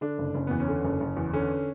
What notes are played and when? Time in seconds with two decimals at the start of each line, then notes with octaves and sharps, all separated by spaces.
0.01 D3 D4
0.18 F#1
0.34 F#1 C#4
0.47 E2 B3
0.60 C#4
0.68 D3
0.84 F#1
1.00 F#1
1.17 E2
1.33 D3 C#4